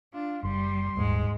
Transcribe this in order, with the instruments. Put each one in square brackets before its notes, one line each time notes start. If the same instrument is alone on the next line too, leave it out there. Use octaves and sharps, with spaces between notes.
[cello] D4 [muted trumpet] F4
[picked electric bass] F#1 [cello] G3 [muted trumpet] C6
[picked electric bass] D#1 [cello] G#2 G#3